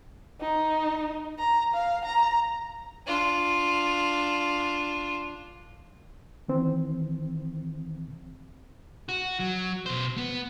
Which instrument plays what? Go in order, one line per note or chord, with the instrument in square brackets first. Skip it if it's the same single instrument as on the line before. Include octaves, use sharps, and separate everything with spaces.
[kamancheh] D#4
A#5
F5
A#5
[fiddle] D4 F4
[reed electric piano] D#3 E3 C4
[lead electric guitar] F#4
F#3
B2 C5
B3